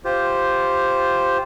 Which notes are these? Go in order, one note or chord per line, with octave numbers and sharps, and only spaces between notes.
F4 G4 C5